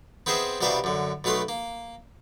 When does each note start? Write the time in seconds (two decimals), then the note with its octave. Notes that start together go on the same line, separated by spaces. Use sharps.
0.26 B3 C4 G#4 C5 D#5 E5
0.61 C2 B2 G3 A#4 E5 F5
0.84 F#2 D3
1.24 B1 B2 A3 B4 C6
1.49 A#3